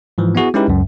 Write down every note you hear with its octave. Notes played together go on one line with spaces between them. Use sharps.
G#2 E3 F3
B3 E4 F#4 G#4
G#3 C#4 D#4 E4 G4 B4
C#2 F#2